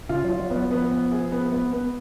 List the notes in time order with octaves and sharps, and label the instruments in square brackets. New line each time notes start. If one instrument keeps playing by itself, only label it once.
[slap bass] C#3 [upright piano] F4
[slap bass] F#3
[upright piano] F4
[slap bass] F#3
[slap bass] F3 [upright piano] B3
[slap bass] F#3
[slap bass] F3 [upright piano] B3
[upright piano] B3
G#4
B3
B3
B3